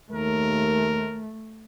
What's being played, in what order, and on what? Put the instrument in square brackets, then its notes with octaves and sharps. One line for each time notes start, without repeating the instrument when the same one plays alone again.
[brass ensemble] D#2 A#4 [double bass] A3